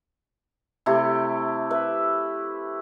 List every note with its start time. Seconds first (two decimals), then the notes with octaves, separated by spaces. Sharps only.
0.86 C3 A3 E4 G4
1.71 B4 E5